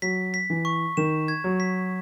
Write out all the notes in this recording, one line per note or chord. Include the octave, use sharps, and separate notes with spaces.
F#3 B6
B6
E3
C#6
D#3 E7
G#6
F#3
B6